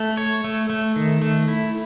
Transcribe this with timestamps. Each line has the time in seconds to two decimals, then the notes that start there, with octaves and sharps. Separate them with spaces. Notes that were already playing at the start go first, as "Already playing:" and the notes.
Already playing: A3
0.17 C#5
0.44 A3
0.70 A3
0.96 D#3
1.22 A3
1.48 E4